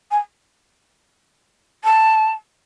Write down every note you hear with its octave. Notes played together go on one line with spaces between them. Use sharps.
G#5
A5